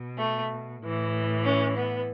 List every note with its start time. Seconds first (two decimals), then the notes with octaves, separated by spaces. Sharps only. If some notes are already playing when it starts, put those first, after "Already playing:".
Already playing: B2
0.19 A3
0.82 A2 E3
1.44 C#4
1.75 B3